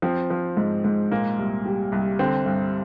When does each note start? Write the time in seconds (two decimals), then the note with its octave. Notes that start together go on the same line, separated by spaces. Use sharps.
0.02 F3 C4
0.30 F3
0.57 G#2
0.84 G#2
1.11 A#2 A#3
1.39 C2
1.66 G3
1.92 C2
2.19 D3 C4
2.46 G2